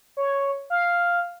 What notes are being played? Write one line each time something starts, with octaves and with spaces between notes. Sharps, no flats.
C#5
F5